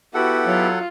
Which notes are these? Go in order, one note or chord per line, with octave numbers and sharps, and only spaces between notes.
B3 E4 F#4 G4 A4 F#5
F#3 F4